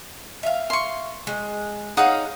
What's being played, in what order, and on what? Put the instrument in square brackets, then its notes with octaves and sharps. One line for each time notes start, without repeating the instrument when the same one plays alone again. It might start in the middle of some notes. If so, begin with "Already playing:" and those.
[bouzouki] E5 F5
[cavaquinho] C6 C#6
[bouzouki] G#3
[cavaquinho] D#4 F#5 D#6 [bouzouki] G#4 C#5 F5